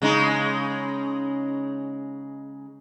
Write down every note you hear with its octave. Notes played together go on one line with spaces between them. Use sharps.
C#3 G#3 D#4